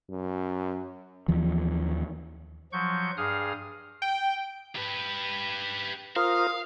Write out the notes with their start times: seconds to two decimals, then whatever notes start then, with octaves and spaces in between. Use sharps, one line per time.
0.10 F#2
1.28 D#2 E3 F3
2.72 F3 F#3 C#6 G6
3.17 G2 G#4 F5 D#6 F6
4.02 G5
4.76 G4 B4
6.16 F4 A#4 C5 F5 D#6 F6